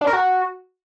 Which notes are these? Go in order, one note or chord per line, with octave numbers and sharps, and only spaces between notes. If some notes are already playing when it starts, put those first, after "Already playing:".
D4
A#4
F#4